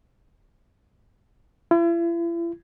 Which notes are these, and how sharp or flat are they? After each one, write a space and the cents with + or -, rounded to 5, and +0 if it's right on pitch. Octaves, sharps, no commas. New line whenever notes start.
E4 +45